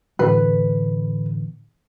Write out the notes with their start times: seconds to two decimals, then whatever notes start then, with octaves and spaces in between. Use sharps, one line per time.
0.19 A2 D3 E3 B4